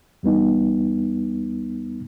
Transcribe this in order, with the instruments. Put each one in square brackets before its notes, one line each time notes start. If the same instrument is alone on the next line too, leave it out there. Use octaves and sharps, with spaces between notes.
[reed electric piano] E2 G3 B3 D#4